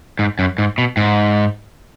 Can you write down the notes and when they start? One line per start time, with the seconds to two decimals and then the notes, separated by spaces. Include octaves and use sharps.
0.19 G#2
0.39 F#2
0.58 G#2
0.78 B2
0.97 G#2